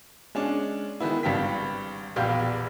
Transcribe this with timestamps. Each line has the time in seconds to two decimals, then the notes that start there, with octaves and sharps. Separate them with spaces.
0.35 G#3 C#4 D4
1.00 D#3 G#3 B3 E4
1.23 G#1 G2 B3 F5 G5 B6
2.16 E1 A#1 B3 G4 F5 G6